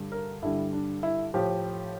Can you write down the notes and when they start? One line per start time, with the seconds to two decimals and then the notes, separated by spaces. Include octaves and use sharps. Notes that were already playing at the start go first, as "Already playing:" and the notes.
Already playing: G2 D3 G3
0.12 A#4
0.42 G2 D3 G3 E4
0.73 D4
1.03 E4
1.34 A2 F3 G4